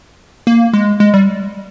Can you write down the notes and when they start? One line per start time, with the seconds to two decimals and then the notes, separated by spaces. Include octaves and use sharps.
0.47 A#3
0.73 G#3
1.00 G#3
1.14 G3